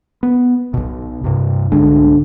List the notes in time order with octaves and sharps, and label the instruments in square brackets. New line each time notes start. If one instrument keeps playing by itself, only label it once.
[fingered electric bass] B3
B1 B2
G2 C3
[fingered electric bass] C2 G#2 G#3 [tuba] D3